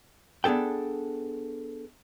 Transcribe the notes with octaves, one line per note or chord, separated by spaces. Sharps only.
B3 D4 G#4 A4 G5